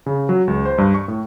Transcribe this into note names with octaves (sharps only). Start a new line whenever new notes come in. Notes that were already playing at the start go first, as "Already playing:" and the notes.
C#3
F#3
C#2
C5
G2
C#6
A2